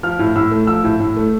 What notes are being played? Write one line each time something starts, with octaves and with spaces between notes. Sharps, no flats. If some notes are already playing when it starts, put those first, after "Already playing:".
F3 F6
A2
A2 E6
A3
F3 E6
A2
A2
A3